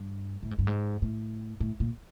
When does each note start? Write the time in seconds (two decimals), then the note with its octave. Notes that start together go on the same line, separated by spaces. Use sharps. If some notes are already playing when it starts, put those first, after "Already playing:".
Already playing: G2
0.43 A2
0.51 G#2
0.59 G2
0.67 G#2
1.02 A2
1.60 A2
1.80 A#2